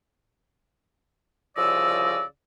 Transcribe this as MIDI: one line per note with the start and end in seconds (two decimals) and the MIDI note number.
1.57 2.23 36
1.57 2.23 49
1.57 2.23 53
1.57 2.23 74
1.57 2.23 75
1.57 2.23 88